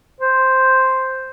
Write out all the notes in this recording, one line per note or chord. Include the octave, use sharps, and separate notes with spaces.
C5